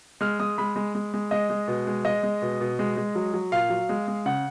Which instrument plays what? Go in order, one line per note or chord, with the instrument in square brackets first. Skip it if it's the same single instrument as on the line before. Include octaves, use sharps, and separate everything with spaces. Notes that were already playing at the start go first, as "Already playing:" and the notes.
[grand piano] G#3 F6
G#3 D#6
G#3 B5
G#3
G#3
G#3
G#3 D#5
G#3
B2
G#3
G#3 D#5
G#3
B2
B2
G#3
G#3
F#3
F#3
A#2 F5
F#3
G#3
G#3
C#3 F#5